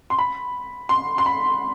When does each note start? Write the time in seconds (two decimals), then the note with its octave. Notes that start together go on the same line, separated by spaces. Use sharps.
0.10 C6
0.18 B5
0.89 C6
1.18 C6
1.26 B5